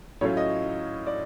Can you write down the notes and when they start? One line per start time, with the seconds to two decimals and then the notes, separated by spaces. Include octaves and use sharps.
0.21 A2 F#3 A3 C#4 F4 C#5
0.37 D#5
1.07 D5